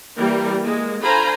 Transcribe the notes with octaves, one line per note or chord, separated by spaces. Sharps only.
E3 G3 A#3 A#4
G#3 A#3
D3 F4 C5 G#5 A#5 B5